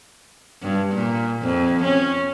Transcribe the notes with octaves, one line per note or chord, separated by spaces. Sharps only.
G2
A#2
F2
C#4